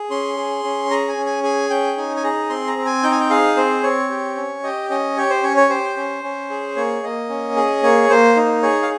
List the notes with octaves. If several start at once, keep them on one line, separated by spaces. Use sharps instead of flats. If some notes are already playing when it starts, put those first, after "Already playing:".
Already playing: G#4
C#4 C6
G#4
C#4
G#4 A#5
G#5
C#4
G#5
G#4 G#5
C#4 G5
D#4 G#5
G#5
G#4 A#5
C4 C6
A#5
C4
G#5
D#4 G5
G#5
G5
G#4 F5
C4 C5
C4 C#5
G4
C#4
G4 D#5
C#4 D#5
G4 C#5
C5
C#4 C#5
C#5
G4 C5
C#4
C#4
G#4
A#3 C#5
A#3 D#5
C#4
G#4
A#3 C#5
A#3 C5
D#4
G#4 C#5
F5